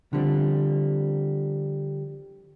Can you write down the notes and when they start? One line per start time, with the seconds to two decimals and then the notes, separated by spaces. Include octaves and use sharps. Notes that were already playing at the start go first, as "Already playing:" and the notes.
0.13 D3 F3 G3 C4